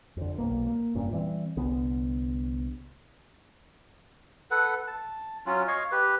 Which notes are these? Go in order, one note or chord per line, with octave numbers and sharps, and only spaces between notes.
F2 D3
B1 F#2 A#3
A#3
F1 G2 A#2 C#4
E3 G3 C4
C2 D3 B3
A4 B4 F#5
A5
F#3 C#4 F4
C#5 D#5 F5 C#6
G4 B4